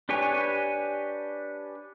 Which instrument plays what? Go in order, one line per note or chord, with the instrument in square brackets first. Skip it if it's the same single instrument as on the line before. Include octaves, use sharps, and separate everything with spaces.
[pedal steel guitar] D4 G4 B4 C#5 G#5